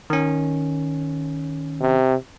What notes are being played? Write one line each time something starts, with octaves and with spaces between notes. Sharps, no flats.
D#3 C#4
C3